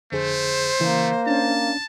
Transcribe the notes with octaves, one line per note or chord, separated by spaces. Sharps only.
F2 D3 A3 G#4 C5
C#3 E3 A#3
C#4 D4 A5